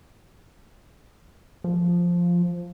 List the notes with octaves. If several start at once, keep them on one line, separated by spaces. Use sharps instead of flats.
F3